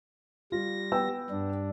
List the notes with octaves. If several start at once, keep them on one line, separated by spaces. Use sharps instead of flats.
G3 F4 A#6
B3 G5 E6
G2 D4